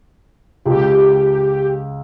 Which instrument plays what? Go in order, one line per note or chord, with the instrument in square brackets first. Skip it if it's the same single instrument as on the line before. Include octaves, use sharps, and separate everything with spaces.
[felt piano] C#2 [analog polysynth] G4